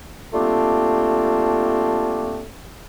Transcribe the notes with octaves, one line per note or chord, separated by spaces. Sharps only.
G3 A3 A#3 C4 D4 F4